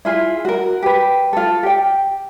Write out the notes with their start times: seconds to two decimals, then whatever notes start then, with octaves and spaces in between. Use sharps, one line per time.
0.05 E4 F4 G#4
0.45 F#4 A#4
0.82 G4 B4
1.33 F4 A4
1.63 G4 G5